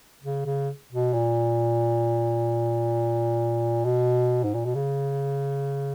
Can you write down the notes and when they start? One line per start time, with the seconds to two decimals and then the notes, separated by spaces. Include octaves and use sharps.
0.23 C#3
0.45 C#3
0.91 B2
1.13 A#2
3.85 B2
4.43 G#2
4.54 A#2
4.65 B2
4.75 C#3